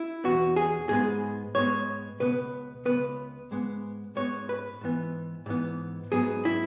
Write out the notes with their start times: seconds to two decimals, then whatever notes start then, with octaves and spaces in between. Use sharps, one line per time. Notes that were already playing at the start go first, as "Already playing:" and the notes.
Already playing: E4
0.24 E2 B2 B3 F#4
0.56 G#4
0.89 G#2 G#3 B3 G#4
1.55 G#2 G#3 B3 C#5
2.20 C#2 B2 B3 B4
2.85 B2 B3 B4
2.90 C#2
3.51 G#2 G#3 B3
4.15 G#2 G#3 B3 C#5
4.49 B4
4.81 G#2 E3 B3
5.46 G#2 E3 B3
6.12 G#2 F#3 B3 G#4
6.45 E4